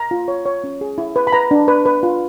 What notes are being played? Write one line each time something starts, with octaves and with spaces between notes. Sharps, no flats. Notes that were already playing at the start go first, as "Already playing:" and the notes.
Already playing: A#5
F4
C#5
C#5
C#4
G#4
E4
B4
B5
B4 A#5
D4
B4
B4
F4